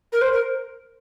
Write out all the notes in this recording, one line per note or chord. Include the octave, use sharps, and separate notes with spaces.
A#4
C5
A#4